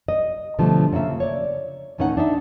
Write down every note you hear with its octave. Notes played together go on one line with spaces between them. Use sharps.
D#5
B2 D3 F3 G3 A3
C#3 A#3 F4 E5
C#5 D5
D#2 A2 C#4 D#4 D#5 F#5
D4 D#4 E5